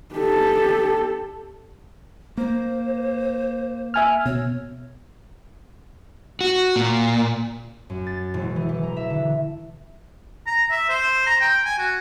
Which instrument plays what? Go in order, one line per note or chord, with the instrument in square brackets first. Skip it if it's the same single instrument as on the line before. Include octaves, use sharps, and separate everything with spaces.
[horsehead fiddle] G4 A4
[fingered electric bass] A#3 [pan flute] C5
[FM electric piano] E5 G#5 F6
[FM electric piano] B2 [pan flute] C#5
[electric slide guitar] F#4
A#2
[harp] F#2
A6
E1
E3
E3
A#5
E5
D3
[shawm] A#5
E5
C5
A#5
G5
G#5
F#4